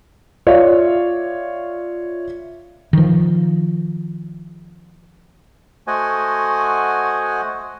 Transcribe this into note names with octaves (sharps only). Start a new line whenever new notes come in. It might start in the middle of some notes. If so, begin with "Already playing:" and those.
F4 C#5 D5 E5 F5
D#3 F3
A3 F#4 C5 D#5 F#5 G#5